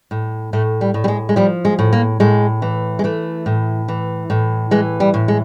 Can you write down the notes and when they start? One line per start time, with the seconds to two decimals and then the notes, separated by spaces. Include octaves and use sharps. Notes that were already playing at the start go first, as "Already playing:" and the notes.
0.11 A2
0.53 A2 A3
0.81 G3
0.94 A2
1.04 G3
1.08 G#3
1.29 G#3
1.36 F3 G3
1.65 G#3
1.79 A2
1.93 A#3
2.20 A2 G#3
2.62 E3
2.99 G#3
3.04 E3 A3
3.46 A2
3.88 E3
4.30 A2
4.71 E3 G#3
5.00 G3
5.14 A2
5.28 G#3